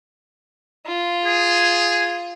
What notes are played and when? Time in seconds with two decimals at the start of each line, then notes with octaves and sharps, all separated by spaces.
0.87 F4
1.23 G#4